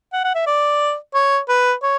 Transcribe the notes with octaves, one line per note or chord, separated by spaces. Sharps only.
F#5
F#5
E5
D5
C#5
B4
C#5